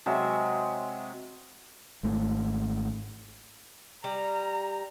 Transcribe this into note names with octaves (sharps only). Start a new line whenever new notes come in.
C3 F#3 G#3 E5
G#1 G#2 A3
G3 A#5